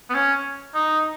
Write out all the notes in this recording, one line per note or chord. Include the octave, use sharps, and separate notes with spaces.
B3
C#4
D#4